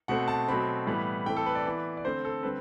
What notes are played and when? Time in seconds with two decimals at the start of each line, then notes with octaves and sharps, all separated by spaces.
0.08 B2 A3 C4 F#5
0.28 A5
0.48 B2 F#3 A3 C4 B5
0.87 A2 E3 G3 B3
1.26 E3 A3 C4 G5
1.37 A4
1.46 B4
1.55 D5
1.65 E3 B3
1.97 D5
2.05 D3 A3 C4 C5
2.25 A4
2.43 D3 G3 C4 B4